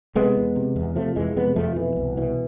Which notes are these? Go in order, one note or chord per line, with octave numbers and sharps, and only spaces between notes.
C3 G#3 B3
E2
C3
E2
C3 F3 A3
F2 E3 G#3
C3 G#3 B3
F2 F3 A3
B2 E3
C2
B2 E3